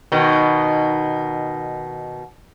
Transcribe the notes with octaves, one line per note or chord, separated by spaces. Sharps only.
B2 D#3